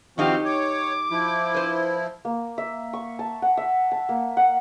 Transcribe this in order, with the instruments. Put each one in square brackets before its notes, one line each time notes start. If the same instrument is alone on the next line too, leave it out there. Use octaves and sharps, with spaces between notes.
[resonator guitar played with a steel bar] D#3 D#4 G4 [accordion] F3 C4 F#4 [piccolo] F5
[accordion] C#5 [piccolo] D6
[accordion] F3 E4
[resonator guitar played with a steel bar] B4 C5
[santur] A#3
E5
C#6
A5
F#5
E5
A5
A#3
F#5